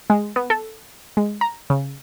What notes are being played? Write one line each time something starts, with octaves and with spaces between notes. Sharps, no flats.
G#3
B3
A4
G#3
A#5
C#3